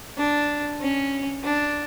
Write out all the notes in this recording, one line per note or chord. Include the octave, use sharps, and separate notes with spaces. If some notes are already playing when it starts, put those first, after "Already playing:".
D4
C#4
D4